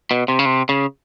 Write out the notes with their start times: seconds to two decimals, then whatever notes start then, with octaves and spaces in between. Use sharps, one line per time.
0.11 B2
0.28 C3
0.39 C#3
0.46 C3
0.69 C#3